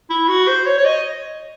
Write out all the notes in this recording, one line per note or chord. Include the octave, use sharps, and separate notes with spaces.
E4
F#4
C5
C#5
C#5
D#5